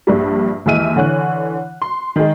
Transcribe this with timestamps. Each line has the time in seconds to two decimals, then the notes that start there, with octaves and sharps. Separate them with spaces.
0.07 A#1 G2 G3
0.66 D#2 E3 G#3 E5 F6 D#7
0.96 D3 E3 C#5 F#6
1.82 C6
2.16 D#3 G#3